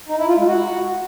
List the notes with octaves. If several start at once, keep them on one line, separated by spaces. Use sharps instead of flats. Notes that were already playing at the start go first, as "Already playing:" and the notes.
D#4
E4
F4
G#3
F#4